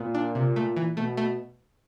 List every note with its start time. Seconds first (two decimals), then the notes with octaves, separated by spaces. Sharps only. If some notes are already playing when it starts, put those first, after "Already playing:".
Already playing: A#2 B3
0.14 D4
0.35 C3
0.56 A3
0.76 E3
0.97 B2 A3
1.17 A3